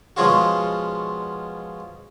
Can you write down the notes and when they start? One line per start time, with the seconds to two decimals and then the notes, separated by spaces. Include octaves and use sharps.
0.17 B2 F3 G#3 C#4 F4 F#4